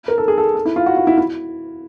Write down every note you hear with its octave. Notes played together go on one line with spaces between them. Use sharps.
A#4
A4
G#4
A4
A4
E4
F4
F#4
F4
E4
E4